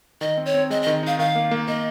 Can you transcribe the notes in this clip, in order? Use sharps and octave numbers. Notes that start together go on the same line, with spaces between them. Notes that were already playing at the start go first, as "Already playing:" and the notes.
D#3 D#5
C4
C#5
C4
G#3 D#5
D#5
D#3
D#4 F5
D#3 F5
A#3
A#3
A#3 D#5